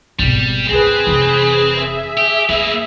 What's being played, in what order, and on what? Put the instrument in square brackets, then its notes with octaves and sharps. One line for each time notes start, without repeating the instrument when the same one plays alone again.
[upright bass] G#1 B2 [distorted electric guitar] G3
[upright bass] D2 [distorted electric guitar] C4 [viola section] G#4 B4
[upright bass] F1 E3
[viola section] G#4 E5
[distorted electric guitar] G4
[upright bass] A3 [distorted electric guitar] A#3 B4